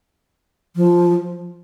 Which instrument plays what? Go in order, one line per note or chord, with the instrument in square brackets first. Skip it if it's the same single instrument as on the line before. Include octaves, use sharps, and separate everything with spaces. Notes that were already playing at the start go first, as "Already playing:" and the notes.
[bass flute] F3